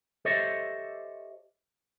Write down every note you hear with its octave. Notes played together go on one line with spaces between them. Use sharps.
G4 A4 C5 C#5 D#5 E5